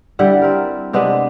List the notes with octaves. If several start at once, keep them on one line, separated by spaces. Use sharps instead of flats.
D3 G3 E4 F#5
C4 A#4
C3 G#3 B3 D4